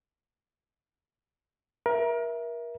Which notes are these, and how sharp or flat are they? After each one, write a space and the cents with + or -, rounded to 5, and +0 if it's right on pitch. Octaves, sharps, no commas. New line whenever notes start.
A#4 +30 E5 +0